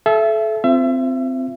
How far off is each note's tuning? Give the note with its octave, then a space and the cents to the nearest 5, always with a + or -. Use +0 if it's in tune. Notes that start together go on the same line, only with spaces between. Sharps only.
A4 -30 E5 +20
C4 -15 F4 -15 E5 +30